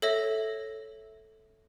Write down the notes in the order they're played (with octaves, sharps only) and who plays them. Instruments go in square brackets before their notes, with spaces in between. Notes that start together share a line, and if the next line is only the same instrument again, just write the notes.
[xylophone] A4 C#5 E5 A#6